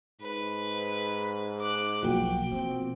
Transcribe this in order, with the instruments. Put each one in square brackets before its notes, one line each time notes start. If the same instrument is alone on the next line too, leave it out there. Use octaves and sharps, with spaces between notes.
[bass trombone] G#2 [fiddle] B4
[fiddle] D6 F#6
[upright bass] B1 E2 [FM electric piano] F3 A#3 F#4 [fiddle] G5
[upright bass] B2 [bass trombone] C4